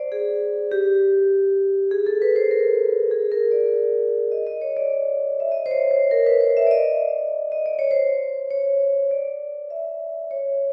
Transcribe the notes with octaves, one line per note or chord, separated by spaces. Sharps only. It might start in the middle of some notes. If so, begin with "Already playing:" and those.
Already playing: C5 D5
G#4
G4
G#4
A4
B4
C5
A#4
G#4
A#4
D5
D#5
D#5
C#5
D5
E5
D#5
C5
C#5
C5
A#4
B4
C5
E5
D5
D#5
D#5
D5
C#5
C5
C#5
D5
E5
C#5